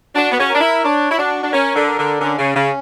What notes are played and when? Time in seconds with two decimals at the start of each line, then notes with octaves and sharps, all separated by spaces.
0.15 D4 F#4
0.32 B3
0.39 C#4
0.49 A#4
0.55 D4
0.61 E4
0.84 D4 C#5
1.11 E4
1.18 D4 F#4
1.43 D4
1.52 C#4 A#4
1.75 D3
1.87 A#4
1.98 D3
2.21 D3 C#4
2.38 C#3
2.56 C#3 C#4